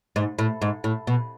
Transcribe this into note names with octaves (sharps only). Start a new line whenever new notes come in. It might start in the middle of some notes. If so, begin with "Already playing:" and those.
G#2
A2
G#2
A2
B2